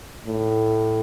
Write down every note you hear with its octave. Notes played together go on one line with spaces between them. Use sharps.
A2